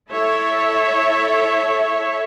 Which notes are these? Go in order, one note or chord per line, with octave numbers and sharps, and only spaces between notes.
E4 A4 C#5 E5